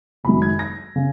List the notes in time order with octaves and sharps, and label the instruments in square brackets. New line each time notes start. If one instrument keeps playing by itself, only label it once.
[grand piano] F#1 F#2 D#3 G#3 B5
G#6
A#6
C#3